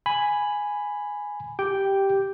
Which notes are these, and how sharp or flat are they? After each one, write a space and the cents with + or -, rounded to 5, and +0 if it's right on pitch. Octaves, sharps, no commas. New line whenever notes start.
G#5 +0 B5 +5
G4 -5 G5 +0